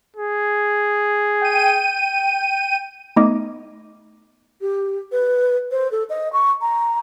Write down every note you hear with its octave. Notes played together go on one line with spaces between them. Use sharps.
G#4
G5 D#7
A3 B3 D#4 D#5 D6
G4
B4
C5
A4
D#5
C#6
A#5